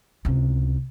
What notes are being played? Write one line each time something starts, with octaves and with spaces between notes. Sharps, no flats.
C#2 C3